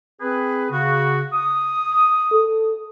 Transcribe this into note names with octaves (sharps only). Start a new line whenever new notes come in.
C4 G#4 B4
C#3 F#4
D#6
A4